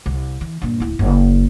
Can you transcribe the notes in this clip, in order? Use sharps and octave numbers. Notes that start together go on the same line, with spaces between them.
C2
E3
G2 A#2
D1 E4
F#1